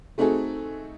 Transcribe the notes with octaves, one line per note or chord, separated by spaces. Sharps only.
A3 C4 D#4 F#4 G#4 A4